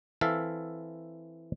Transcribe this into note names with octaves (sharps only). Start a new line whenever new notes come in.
E3 C4 A4 E5 F5